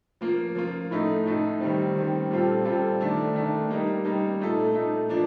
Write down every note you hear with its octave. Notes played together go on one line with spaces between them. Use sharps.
F3 A#3 F4
F3 A#3 F4
A2 A3 D#4 A4
A2 A3 D#4 A4
D#3 G3 C4
D#3 G3 C4
A#2 G3 C4 F4 A4
A#2 G3 C4 F4 A4
D#3 A3 D4
D#3 A3 D4
G3 A#3 D#4
G3 A#3 D#4
A#2 A3 D#4 A4
A#2 A3 D#4 A4
F3 A#3 D4